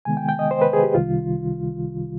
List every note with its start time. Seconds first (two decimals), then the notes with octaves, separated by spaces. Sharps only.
0.05 C3 D#3 G#3 B3 G#5
0.17 G5
0.29 G5
0.39 D#5
0.51 C5
0.62 B4
0.73 G#4
0.83 G4
0.94 C2 C3 D#3 G3 F4